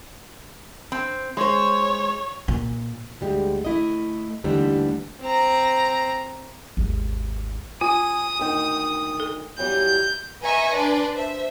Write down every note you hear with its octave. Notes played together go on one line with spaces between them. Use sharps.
C4
G#3 C5 C#5
A#2
D2 G3 G#3
A3 E4 D#5
D#2 D3 E3 G3 A3
C4 A#5
G#1 D#2
F4 G#5 D#6
D2 D#3 G5
A4
E2 F#3 G3 G6
B4 D#5 E5 G#5 A#5 C#6
D4 B4 D5 C6
C5 E5